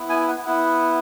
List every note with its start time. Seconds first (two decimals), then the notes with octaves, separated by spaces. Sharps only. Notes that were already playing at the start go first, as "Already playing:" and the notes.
Already playing: B3 E4
0.09 G#5
0.28 F#5
0.46 B3 E4 F#5